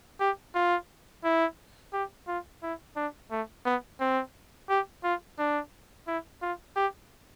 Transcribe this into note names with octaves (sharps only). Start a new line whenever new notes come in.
G4
F4
E4
G4
F4
E4
D4
A3
B3
C4
G4
F4
D4
E4
F4
G4